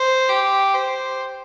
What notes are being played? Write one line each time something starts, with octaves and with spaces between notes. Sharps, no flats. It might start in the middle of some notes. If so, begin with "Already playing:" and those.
Already playing: C5
G4
C5